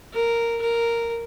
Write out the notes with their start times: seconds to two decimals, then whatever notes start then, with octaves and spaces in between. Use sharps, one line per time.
0.13 A#4
0.61 A#4